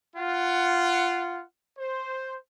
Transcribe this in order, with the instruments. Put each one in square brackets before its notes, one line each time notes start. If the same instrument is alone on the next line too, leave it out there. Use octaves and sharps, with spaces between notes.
[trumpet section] F4 F#5
C5